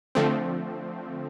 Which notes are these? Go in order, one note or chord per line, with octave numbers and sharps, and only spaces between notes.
D3 F3 A3 C4